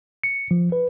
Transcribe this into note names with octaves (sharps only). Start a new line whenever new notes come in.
C#7
F3
B4